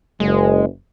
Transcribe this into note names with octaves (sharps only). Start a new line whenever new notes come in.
F#1 G#3